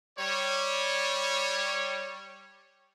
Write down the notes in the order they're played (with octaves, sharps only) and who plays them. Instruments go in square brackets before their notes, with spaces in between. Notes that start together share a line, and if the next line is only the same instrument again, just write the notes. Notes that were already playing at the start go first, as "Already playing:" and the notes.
[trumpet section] G3 C#5